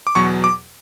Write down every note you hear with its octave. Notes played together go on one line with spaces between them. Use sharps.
D6
E2 B2 F#3 C#6
D6